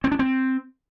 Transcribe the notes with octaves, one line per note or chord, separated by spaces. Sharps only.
C4
D4
C4